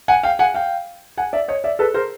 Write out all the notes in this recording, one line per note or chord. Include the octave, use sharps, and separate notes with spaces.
F#5 G#5
F5 G5
F#5 G#5
F5 G5
F#5 G#5
D5 E5
C#5 D#5
D5 E5
A4 B4
A#4 C5